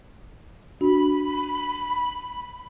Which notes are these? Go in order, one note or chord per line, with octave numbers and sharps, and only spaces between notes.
D4 F#4 B5